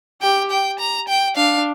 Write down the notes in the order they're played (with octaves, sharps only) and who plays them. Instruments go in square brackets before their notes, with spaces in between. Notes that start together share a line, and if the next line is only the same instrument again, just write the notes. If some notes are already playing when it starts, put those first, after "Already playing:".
[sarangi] G4 [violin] G5
[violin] G5
A#5
G5
[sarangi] D4 [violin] F5